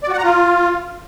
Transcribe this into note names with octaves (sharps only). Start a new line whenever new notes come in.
D5
F#4
F#5
A#5
F4